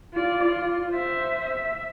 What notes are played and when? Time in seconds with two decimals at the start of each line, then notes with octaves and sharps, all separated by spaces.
0.14 F4 D5
0.47 F4
0.91 C5 E5
1.46 E5